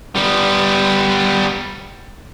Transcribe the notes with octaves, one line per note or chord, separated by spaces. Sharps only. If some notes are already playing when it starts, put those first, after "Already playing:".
G3 B3